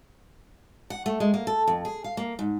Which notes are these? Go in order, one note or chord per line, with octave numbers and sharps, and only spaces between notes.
F#5
A3
G#3
A#3
A4
F2
G#4
F5
A#3
G#2